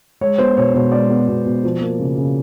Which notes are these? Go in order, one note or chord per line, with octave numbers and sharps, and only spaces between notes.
G#3 C#5
B3 C5
B2 C#5
B2 C#5
G#3 D5
B3
B2
B2
F3
A#3
C#3
C#3